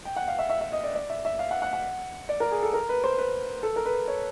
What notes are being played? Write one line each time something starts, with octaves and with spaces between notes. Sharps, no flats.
G5
F#5
F5
E5
E5
E5
D#5
D5
D5
E5
E5
F5
F#5
F#5
F#5
D5
A#4
G#4
A4
A#4
B4
C5
B4
A4
A#4
B4
C#5